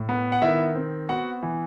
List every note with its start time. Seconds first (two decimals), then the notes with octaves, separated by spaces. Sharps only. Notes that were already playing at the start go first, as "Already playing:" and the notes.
Already playing: A2
0.09 B3
0.32 F#5
0.42 D#3 E4 E5
0.75 C4
1.09 B3 F#4 F#5
1.43 E3